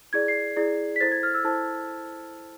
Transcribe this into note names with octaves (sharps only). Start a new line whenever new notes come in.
E4 G#4 D5 G#6
C7
E4 G#4 D5
B6
E4 A4 C5 A6
G#6
F6
E6
E4 A4 C5 A5